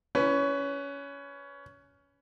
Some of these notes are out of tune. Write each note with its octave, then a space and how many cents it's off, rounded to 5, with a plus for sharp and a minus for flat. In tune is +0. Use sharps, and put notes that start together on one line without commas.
C#4 +20 B4 +15